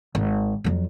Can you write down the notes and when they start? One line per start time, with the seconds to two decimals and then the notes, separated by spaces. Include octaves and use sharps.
0.15 G#1
0.64 F2 F#3